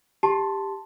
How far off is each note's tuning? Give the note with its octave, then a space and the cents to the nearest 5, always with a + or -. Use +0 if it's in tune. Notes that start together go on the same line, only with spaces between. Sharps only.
G4 +10 A5 +0 C6 +0